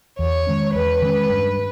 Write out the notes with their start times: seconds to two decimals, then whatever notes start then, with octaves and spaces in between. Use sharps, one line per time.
0.18 E2 C#5
0.47 D#3 G#3 C#4
0.74 E2 B4
1.02 D#3 G#3 C#4
1.29 G2